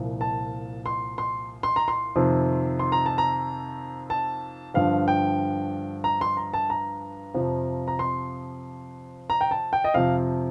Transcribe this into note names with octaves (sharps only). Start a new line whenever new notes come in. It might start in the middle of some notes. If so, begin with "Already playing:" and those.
Already playing: C2 A#2 F3
A5
C6
C6
C6
A#5
C6
F2 C3 D#3
C6
A#5
A5
A#5
A5
G2 D3 F3 F5
G5
A#5
C6
A#5
A5
A#5
F2 C3 F3
A#5
C6
A#5
G5
A5
G5
D#5
F2 C3 F3 F5